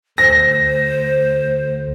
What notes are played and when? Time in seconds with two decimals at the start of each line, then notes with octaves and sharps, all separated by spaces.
0.18 D2 D3 C5 A#6